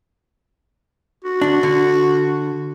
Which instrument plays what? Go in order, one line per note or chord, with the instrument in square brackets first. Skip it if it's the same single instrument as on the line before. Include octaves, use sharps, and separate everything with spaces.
[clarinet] F#4
[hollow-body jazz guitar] D2 D4
D3